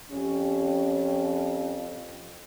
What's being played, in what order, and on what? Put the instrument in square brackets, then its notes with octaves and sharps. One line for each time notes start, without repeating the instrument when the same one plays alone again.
[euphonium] F2 [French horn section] C#4 G4